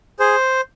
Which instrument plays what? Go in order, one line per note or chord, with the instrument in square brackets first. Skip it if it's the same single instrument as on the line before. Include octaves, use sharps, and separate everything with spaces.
[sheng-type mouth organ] G#4 C5